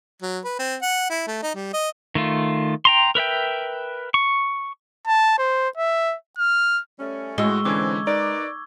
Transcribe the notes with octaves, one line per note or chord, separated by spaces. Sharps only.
F#3
B4
C4
F#5
E4
A3
D#4
G3
D#5
D#3 A3 F4
G5 A#5 C6
A#4 B4 E5 G5
C#6
A5
C5
E5
F6
G3 A3 C#4
A2 G#3 F#4 C#6 E6 G7
D3 E3 C4 C#4 D6 G#6
D#4 A#4 B4 D5